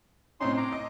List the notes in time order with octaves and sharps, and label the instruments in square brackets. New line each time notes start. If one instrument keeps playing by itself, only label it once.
[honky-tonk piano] A2 C4 C#4 [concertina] D#4 C6
[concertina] A#5 D6
[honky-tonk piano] D#5